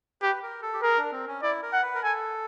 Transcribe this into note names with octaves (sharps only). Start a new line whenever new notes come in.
G4 B4
A#4
A4
G4
G#4 A#4
D4
C4
C#4
E4 D5
A#4
F#5
B4
A#4
A4 G#5